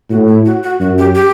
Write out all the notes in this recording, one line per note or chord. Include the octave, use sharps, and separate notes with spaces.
A2 F#4
E4
F#4
F#4
F#2 F#4
G4
G4